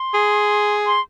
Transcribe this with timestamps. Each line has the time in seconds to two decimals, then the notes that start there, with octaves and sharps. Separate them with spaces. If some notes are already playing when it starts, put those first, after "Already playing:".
Already playing: C6
0.14 G#4
0.86 C6